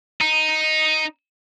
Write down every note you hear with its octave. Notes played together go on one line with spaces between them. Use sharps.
D#4